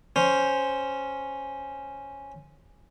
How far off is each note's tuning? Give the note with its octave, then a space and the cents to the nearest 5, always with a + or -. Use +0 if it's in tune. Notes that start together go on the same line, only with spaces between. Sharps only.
C#4 +0 C5 +0